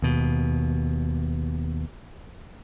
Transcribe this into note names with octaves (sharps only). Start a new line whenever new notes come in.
D#2 B2